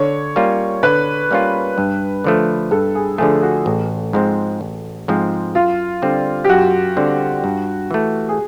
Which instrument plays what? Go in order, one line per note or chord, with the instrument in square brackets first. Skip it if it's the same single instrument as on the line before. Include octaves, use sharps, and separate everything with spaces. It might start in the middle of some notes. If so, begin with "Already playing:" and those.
Already playing: [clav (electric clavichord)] D3 [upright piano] C#5
[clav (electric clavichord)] G3 A#3 C#4 F4
[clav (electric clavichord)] D3 [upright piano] B4
[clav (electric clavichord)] G3 A#3 C#4 F4
G2
D3 F3 A3
[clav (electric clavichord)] G2 [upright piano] A4
[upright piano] G#4
[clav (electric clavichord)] D3 F3 A3 [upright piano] G#4
[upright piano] F#4
[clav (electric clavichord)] A1
G#2 F3 G#3 C4
A1
G#2 F3 G#3 C4
[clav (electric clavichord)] F#2 [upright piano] F4
[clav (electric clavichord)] D3 G3 C4
[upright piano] G4
[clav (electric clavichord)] F#2 [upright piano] F#4
[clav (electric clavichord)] D3 G3 C4
G2
E3 A3
[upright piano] G#4